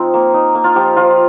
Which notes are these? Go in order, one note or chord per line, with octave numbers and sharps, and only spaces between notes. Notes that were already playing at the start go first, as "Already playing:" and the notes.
Already playing: F3 C4 D#4 F4
A#3
D#4
A#3
F4
F3 G4
F3 F4